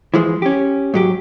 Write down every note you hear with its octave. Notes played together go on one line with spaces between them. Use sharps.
E3 F3 G#3
C#4 G4
G#2 F#3 G4